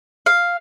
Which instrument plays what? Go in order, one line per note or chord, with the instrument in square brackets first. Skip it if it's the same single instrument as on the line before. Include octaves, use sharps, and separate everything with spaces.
[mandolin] F5